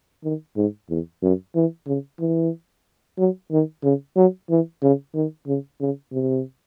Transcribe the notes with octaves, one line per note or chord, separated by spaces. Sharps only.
D#3
G#2
E2
F#2
E3
C#3
E3
F#3
D#3
C#3
F#3
E3
C#3
D#3
C#3
C#3
C3